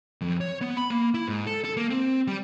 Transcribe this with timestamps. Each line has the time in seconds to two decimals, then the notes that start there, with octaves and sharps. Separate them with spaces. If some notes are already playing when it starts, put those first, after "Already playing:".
0.21 F2
0.41 C#5
0.61 B3
0.77 B5
0.90 A#3
1.14 E4
1.28 G#2
1.47 A4
1.64 A4
1.77 A#3
1.90 C4
2.27 G3